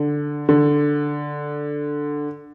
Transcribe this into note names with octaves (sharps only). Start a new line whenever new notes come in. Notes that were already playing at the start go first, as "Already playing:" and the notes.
Already playing: D3
D3